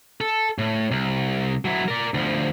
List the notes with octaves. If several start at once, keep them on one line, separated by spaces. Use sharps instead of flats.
A4
A2
C2
F#3 E4
A#4 D5
D2 F3